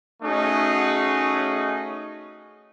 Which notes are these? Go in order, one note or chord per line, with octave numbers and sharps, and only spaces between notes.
A3 C#4 D#4 F#4 G#4